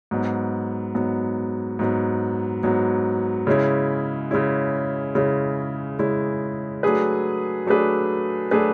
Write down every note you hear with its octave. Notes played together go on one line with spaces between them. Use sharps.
G#2 F#3 B3
G#2 F#3 B3
G#2 F#3 B3
G#2 F#3 B3
C#3 G#3 C#4 E4
C#3 G#3 C#4 E4
C#3 G#3 C#4 E4
C#3 G#3 C#4 E4
F#3 A3 D4 G#4 B4
F#3 A3 D4 G#4 B4
F#3 A3 D4 G#4 B4